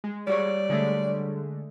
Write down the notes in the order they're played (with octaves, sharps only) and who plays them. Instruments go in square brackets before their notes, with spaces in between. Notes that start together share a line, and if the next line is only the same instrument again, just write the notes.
[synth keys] G#3
[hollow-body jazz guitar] G3 F#4 C#5 [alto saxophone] D5
[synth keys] D3 G#3 A3